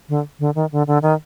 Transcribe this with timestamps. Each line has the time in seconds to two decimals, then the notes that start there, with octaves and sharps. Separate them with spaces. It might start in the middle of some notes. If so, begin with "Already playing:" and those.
0.09 D3
0.40 D3
0.55 D#3
0.72 D3
0.87 D3
1.02 D#3